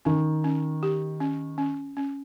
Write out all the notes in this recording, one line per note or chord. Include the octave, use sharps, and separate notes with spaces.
D#3 C#4
C#4
G4
C#4
C#4
C#4